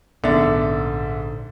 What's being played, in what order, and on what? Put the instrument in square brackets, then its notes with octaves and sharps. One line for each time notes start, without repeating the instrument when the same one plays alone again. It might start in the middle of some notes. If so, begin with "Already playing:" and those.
[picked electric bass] A#1 B3 C#4 [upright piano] G#2 E5 A6 [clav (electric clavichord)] D3